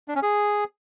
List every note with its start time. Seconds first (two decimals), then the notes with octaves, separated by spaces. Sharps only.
0.08 D4
0.15 C#4
0.23 G#4